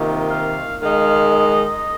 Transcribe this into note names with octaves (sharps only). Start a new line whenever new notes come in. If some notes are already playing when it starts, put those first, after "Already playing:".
Already playing: C3 D#3 A#3 F4
F5
D#3 G#3 D#4 F5
D#5